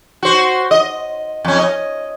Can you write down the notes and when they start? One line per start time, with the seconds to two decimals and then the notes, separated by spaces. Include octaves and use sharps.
0.23 F#4 C5
0.71 D#5
1.45 F2 C#4
1.59 D#5